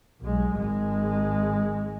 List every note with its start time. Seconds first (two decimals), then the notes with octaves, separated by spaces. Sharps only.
0.21 B1 G#3
0.57 G#1 G#3